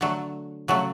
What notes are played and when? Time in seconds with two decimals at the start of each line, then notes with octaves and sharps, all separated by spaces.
0.01 D3 F#3 A3
0.68 C#3 F#3 A3